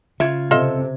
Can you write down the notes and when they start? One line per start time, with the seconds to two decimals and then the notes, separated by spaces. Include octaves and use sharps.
0.20 C#3 F4 E5 G#6
0.51 C3 F4 A4 D#5 E5